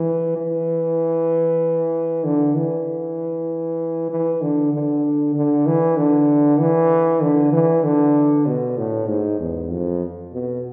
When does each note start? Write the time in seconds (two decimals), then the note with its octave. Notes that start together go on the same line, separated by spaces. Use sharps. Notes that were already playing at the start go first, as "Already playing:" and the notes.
Already playing: E3
0.37 E3
2.24 D3
2.55 E3
4.11 E3
4.41 D3
4.73 D3
5.35 D3
5.67 E3
5.97 D3
6.59 E3
7.22 D3
7.53 E3
7.84 D3
8.46 B2
8.78 A2
9.08 G#2
9.40 E2
9.71 F2
10.33 B2